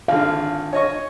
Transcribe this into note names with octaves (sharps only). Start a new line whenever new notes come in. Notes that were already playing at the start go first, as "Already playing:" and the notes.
G#1 D3 F5
C#5 D#5 C#6